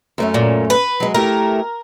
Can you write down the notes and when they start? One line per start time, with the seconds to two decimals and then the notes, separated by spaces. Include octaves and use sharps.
0.18 F#2 A3 C#4
0.34 A#2
0.70 B4
1.00 F#3 G#3
1.15 A3 E4 G4 A#4